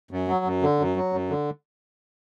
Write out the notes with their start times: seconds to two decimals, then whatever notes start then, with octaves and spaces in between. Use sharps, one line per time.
0.11 F#2
0.28 F#3
0.45 F#2
0.62 D3
0.79 F#2
0.96 F#3
1.13 F#2
1.30 D3